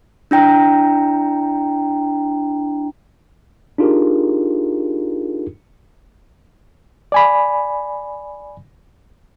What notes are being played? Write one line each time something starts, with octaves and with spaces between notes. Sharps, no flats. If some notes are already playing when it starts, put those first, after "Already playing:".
D4 E4 G5 A#5
D4 D#4 F4 G4 G#4 A#4
D5 G#5 B5